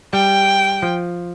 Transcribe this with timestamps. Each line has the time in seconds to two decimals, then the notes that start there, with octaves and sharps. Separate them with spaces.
0.13 G3 G5
0.82 F3